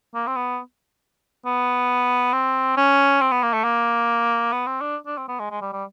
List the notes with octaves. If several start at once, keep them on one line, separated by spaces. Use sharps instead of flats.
A#3
C4
B3
B3
C4
C#4
C4
B3
A#3
A3
A#3
B3
C4
D4
D4
C4
B3
G#3
G#3
G3
G3